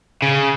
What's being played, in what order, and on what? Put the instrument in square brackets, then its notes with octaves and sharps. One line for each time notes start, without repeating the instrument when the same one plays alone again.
[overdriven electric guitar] C#3